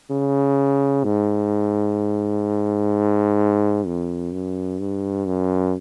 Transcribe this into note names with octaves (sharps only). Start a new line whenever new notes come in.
C#3
G#2
F2
F#2
G2
F#2